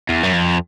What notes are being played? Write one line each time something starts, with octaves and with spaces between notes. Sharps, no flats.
E2
F#2
F2